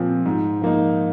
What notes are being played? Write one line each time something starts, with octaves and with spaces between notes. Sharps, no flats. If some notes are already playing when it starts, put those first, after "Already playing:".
Already playing: A#2 F3 C4
G#2
F3 A#3 D#4